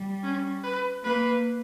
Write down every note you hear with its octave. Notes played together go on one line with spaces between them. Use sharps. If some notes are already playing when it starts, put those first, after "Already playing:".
Already playing: G3
C#4
B4
A#3 B4